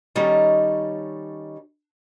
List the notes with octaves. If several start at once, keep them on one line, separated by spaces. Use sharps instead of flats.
D#3 G3 C#4 D#4 A4 C#5